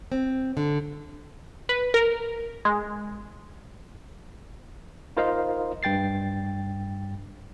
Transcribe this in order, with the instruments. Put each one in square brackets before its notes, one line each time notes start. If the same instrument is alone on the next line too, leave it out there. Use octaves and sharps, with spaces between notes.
[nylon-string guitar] C4
D3
[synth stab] B4
A#4
G#3
[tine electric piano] D#4 F4 A#4 C5 D#5 F5
G2 G5 A6 C7